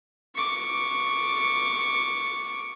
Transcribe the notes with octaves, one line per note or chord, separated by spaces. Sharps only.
C#6 D6